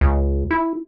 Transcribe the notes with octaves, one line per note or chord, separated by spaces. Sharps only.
C#2
E4